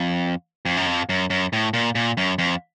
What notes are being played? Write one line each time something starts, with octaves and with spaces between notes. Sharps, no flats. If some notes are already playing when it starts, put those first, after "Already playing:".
Already playing: F2
F2
F#2
F2
F#2
F#2
A2
A#2
A#2
F#2
F2